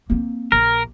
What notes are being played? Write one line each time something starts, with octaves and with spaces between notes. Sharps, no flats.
A#3 C4
A#1 A#4